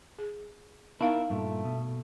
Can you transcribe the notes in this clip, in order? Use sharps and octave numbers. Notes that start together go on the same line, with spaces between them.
G#4
B3 D#4 E4 A#4 F5
G2 A#2 A3
B2